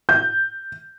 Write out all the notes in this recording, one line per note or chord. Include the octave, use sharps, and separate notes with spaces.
G6